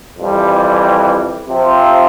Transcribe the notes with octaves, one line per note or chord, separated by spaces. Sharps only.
F2 E3 G3
C3 F3 C4 F4